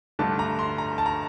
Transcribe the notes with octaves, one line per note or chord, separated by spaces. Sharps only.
G2 D3 A3 D4 A5
A#5
C6
A#5
A5
A#5